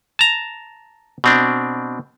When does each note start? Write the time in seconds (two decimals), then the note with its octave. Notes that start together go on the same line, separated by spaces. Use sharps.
0.19 A5 A#5
1.24 B2 C4 D4